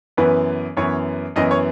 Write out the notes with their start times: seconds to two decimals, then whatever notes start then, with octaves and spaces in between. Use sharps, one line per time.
0.17 F#2 E3 B3 B4
0.77 F#2 E3 B3 C#5
1.36 F#2 E3 B3 D#5
1.51 C#5